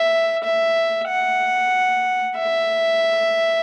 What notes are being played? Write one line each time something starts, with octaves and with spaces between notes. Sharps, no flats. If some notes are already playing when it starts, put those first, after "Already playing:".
Already playing: E5
E5
F#5
E5